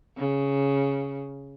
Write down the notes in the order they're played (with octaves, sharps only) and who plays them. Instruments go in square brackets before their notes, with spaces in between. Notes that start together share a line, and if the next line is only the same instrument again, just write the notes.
[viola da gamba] C#3